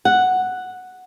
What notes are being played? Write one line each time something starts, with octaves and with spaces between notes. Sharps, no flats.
F#5